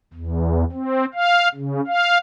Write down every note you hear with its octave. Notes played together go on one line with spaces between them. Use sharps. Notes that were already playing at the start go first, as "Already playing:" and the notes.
E2
C4
F5
C#3
F5